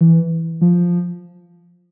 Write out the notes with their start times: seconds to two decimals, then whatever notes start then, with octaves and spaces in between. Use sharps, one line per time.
0.01 E3
0.61 F3